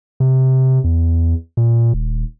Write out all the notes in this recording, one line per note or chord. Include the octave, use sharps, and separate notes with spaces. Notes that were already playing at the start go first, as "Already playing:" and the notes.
C3
E2
A#2
D#1